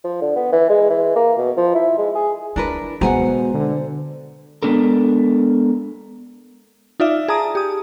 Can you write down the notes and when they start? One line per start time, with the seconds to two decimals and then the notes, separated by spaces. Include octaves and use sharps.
0.04 F3
0.21 D3
0.36 B3
0.52 E3
0.69 G#3
0.90 E3
1.16 A#3
1.38 B2
1.57 F3
1.75 E4
1.98 G#3
2.15 G#4
2.56 D4 E4 A#4 B4
3.01 B2 G#3 C5 F#5 G#5 A#5
3.54 D3
4.63 G#3 B3 D4 A4 A#4
7.00 D#4 F4 D5 E5
7.28 G#4 A5 A#5 D#6
7.55 G4 D#6